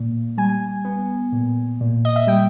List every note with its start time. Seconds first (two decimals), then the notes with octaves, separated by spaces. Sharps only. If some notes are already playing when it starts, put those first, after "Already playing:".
Already playing: A#2
0.38 G3 G#5
0.85 B3
1.32 A#2
1.81 A#2
2.05 D#5
2.16 E5
2.27 G3 G5